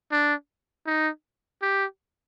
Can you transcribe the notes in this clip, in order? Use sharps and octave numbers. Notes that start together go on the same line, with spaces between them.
D4
D#4
G4